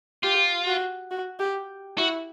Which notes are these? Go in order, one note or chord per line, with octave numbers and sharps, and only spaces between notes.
F4 G4
F#4
F#4
G4
E4 F#4